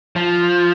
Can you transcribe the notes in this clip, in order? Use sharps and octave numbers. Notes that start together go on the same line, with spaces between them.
F3